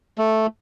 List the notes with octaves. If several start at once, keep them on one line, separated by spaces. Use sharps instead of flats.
A3